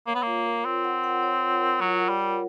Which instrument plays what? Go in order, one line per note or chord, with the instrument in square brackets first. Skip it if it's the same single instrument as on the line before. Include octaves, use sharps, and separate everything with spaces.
[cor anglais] A#3 [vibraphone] C#5
[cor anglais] B3
[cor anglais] A#3 [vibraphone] F4
[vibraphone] A#4
[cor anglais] C4 [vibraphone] F4
[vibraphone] F#5
F#5
C#5
F4
A#4
[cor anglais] F#3 [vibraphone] F4
[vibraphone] A#4
[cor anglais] G3
[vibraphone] A#4